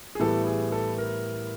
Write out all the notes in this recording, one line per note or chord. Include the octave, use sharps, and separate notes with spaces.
G#4
A2 E3 G3 B3 A4
G#4
A4
A#4